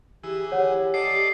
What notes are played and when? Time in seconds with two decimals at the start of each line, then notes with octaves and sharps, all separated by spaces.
0.23 E3 G4 G#4 E6
0.52 G4 C#5 F#5
0.94 A4 D5 D#5 C7